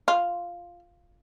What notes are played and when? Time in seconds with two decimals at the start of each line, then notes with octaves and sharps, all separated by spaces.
0.08 F4